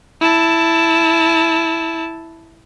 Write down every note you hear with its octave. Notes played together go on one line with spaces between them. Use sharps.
E4 A5